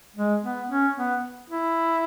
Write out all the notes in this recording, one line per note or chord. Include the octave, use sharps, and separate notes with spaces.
G#3
B3
C#4
B3
E4